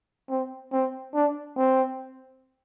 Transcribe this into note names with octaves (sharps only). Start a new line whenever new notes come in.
C4
C4
D4
C4